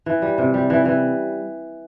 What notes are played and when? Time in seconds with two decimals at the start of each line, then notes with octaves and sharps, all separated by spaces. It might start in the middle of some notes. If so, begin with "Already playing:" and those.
0.06 E3
0.22 G3
0.38 C3
0.54 G3
0.70 E3
0.85 E3